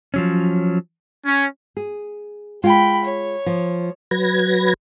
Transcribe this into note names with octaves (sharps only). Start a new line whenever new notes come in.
F3 F#3 C#4
C#4
G#4
G#3 F4 G5 B5
C#5
F3
F#3 B4 G#6 A#6